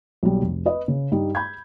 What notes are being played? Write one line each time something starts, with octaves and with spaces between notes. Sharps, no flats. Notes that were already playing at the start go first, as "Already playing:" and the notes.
B1 G3
F1
B4 D#5
C#3
G2 G3 D#4
B5 G6 G#6